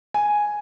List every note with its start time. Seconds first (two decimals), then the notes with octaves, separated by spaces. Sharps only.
0.14 G#5